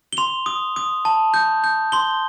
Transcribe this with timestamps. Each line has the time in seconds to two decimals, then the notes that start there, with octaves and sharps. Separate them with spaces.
0.13 G7
0.17 C6 F7
0.46 D#6
0.76 D#6
1.05 A5
1.34 G6
1.64 G6
1.92 C6 G7